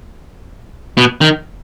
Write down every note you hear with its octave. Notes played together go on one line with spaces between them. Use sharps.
B2
D#3